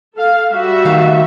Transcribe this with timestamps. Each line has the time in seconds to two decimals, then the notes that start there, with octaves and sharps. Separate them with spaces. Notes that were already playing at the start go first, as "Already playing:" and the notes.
0.16 A4 F5
0.52 G3 F#4 E5
0.85 D#3 A3 F5